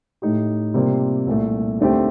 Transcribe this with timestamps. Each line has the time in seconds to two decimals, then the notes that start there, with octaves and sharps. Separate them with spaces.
0.22 A2 A3 D#4 G4
0.74 C3 G3 A#3 F4
1.27 C2 A#2 A3
1.80 D#2 D3 A3 C4 G4